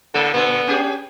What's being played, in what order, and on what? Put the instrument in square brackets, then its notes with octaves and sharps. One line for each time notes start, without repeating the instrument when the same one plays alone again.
[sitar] A2 A#3 A4 [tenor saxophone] D3
[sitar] A#2 D3 A4 [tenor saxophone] B3
[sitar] C#4 G4 G#4